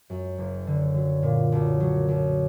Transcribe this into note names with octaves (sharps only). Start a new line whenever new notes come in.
F#2
F#1
D3
F#3
A#2
B1
F#3
B1